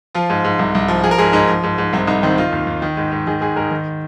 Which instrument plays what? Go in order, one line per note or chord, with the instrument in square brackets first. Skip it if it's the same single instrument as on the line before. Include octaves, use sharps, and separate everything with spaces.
[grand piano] F3 F4
G#2
G#2
C2
C2
F3
F3 G#4
A#4
G#2 G#4
G#2 D#4
F3
G#2
G#2
C2 C4
C2 D#4
D#3 C4
D#3 F4
D#2
D#2
D#3
G#2
G#2
D#3 G#4
G#2 G#4
G#2 A#4
D#3